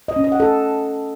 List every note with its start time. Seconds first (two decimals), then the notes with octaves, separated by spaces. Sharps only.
0.08 D#5
0.16 C#4
0.24 D#5
0.32 F#5
0.40 A4